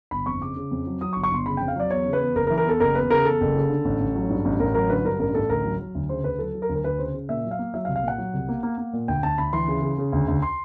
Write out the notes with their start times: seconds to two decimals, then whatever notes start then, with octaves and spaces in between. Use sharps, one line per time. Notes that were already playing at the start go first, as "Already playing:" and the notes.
0.11 G1 B5
0.26 F2 C#6
0.41 C#3 D6
0.56 C#3
0.71 F2
0.86 F#3
1.01 F#3 D#6
1.13 C#6
1.16 G1
1.23 C#6
1.31 G1 C6
1.46 C#3 B5
1.57 F2 G5
1.68 F5
1.76 F#3 D5
1.90 E2 C#5
2.06 C#3
2.13 B4
2.20 E2
2.35 F#1 A#4
2.47 A#4
2.50 E3
2.58 A#4
2.65 E2 A4
2.80 F#1 A#4
2.95 E2 B4
3.10 C#3 A#4
3.25 E2 A4
3.41 F#1
3.56 C#3
3.70 D3
3.85 A1
4.00 A1
4.15 F#3
4.30 G2
4.45 A1
4.59 A1 A#4
4.74 F#3 A#4
4.89 D3 B4
5.05 G2 A#4
5.19 A1 A#4
5.35 A1 A4
5.49 D2 A#4
5.64 F#3
5.80 F#3
5.95 D2
6.09 C#3 C5
6.24 D2 B4
6.39 F#3 A4
6.54 F#3
6.62 A#4
6.69 D2
6.76 A#4
6.84 D2 B4
6.99 C#3 C5
7.13 C#3
7.29 A#2 E5
7.44 F#3
7.51 F5
7.59 A#3
7.74 F#3 E5
7.85 F5
7.88 C2
7.96 F5
8.03 A#2 F#5
8.18 F#3
8.34 C2
8.48 A#3
8.63 A#3
8.78 A#3
8.93 A#2
9.08 D2 G5
9.23 D2 A5
9.38 D2 B5
9.53 E3 C6
9.68 C#3
9.82 C#3
9.98 C#3
10.12 D2
10.28 D2
10.42 C6